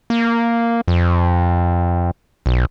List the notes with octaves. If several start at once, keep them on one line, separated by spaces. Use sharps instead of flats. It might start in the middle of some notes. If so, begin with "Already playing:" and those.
A#3
F2
B1